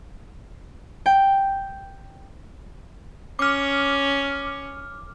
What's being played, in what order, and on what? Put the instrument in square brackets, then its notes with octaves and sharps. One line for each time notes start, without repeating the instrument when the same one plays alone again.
[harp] G5
[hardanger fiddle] C#4 [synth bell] D6 F6